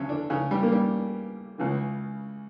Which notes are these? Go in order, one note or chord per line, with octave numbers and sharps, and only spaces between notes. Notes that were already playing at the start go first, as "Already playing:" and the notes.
Already playing: D2 C#3 F#3 C#4
D3 D4
C#3 C#4
G3
A#3
G3
C#2 C#3 E3